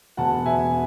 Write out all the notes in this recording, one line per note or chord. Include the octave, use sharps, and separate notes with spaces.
E1 F#5 A5
E1 E5 G#5